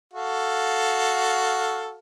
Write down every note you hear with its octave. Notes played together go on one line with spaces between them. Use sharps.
F#4 A4 F5